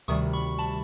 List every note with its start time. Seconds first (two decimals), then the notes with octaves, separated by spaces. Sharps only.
0.08 D2 C3 D#3 G3 C#6 D#6
0.33 B5 C#6
0.59 A5 B5